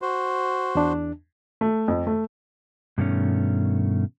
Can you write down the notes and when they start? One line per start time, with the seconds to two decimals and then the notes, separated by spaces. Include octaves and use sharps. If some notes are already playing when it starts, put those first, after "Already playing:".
0.02 F#4 C5
0.75 E2 D4
1.61 A3
1.88 F2
2.07 A3
2.98 G2 B2 D#3 A3 C#4